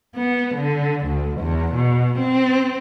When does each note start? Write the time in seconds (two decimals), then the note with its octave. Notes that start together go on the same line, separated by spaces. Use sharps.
0.15 B3
0.54 D3
1.06 D2
1.39 E2
1.75 B2
2.18 C4